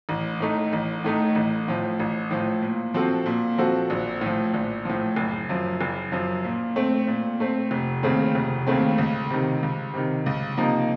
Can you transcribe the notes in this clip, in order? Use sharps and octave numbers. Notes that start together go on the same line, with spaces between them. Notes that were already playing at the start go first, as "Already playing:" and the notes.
A1
A2 A3 D#4
A1
A2 A3 D#4
A1
A2 F3
A1
A2 F3
A#2
F3 C4 F#4 A4
A#2
F3 C4 F#4 A4
A#1
A2 F3
A#1
A2 F3
F#1
F#2 F3
F#1
F#2 F3
A#2
A3 C4
A#2
A3 C4
F1
D#2 C#3 A3 C4
F1
D#2 C#3 A3 C4
C#2
C3 D#3
C#2
C3 D#3
C#2
C3 F3 A#3 D#4